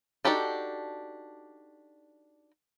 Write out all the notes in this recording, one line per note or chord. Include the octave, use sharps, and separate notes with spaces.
D4 D#4 F#4 G4 A4